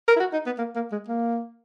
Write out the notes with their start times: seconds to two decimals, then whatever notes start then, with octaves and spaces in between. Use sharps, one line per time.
0.08 A#4
0.16 E4
0.20 F#4
0.33 D#4
0.46 B3
0.58 A#3
0.75 A#3
0.92 G#3
1.08 A#3